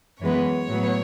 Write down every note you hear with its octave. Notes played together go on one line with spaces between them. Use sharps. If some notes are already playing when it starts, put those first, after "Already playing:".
F#2 E3 G#3 B3 C#5
A2 F#3 B3